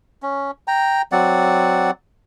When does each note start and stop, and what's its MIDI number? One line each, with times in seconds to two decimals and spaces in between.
0.23 0.51 61
0.68 1.02 79
0.68 1.02 82
1.12 1.91 54
1.12 1.91 60
1.12 1.91 74
1.12 1.91 78